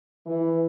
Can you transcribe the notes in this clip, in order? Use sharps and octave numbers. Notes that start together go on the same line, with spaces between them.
E3